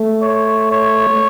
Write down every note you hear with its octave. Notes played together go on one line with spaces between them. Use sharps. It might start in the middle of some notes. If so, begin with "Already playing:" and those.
Already playing: A3
C#5
C#5